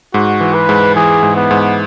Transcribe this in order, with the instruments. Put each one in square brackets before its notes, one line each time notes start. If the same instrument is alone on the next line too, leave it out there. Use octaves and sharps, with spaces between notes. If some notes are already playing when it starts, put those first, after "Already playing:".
[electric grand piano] G#2 [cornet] F#4
[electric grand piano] E3
[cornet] B4
[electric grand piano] G#2
[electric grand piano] E3 [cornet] G#4
[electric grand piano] G#2
[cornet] B3
[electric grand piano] G#2